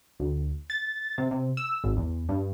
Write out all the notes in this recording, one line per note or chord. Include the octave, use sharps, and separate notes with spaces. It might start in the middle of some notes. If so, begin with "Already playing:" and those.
D2
A6
C3
C3
E6
G#1
E2
G2